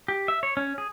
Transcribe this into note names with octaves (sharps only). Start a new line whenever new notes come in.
G4
E5
C#5
C#4
G#4